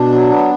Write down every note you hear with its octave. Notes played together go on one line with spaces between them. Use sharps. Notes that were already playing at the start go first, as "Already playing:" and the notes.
Already playing: B2 D4
F#3
B3